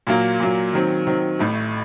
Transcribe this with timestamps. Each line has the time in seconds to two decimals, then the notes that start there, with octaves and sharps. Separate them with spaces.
0.07 A#2 F#3 A#3
0.40 A#2 F#3 A#3
0.73 D#3 F#3 C4
1.07 D#3 F#3 C4
1.39 A1 A2 A3